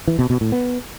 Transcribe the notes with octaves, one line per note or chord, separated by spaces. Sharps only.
E3
B2
B2
A2
B3